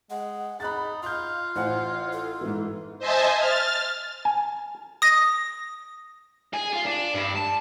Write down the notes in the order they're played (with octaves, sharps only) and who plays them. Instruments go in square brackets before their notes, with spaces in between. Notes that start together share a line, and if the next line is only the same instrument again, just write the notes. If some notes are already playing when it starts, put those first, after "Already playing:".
[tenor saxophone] G#3 [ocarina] F#5
[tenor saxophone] D#4 [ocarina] G#4 [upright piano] B5 F#6 A6
[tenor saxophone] F4 [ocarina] F5 [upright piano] F6 G6
[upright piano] A1 F#5 G#5 [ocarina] C5
[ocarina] A4
[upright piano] G#2 E3
[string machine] C5 D#5 E5 G#5 A5
F6 A6
[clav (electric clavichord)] G#5
[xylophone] D#6 A#6
[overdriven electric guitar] G#4
F4
D4
G2
A5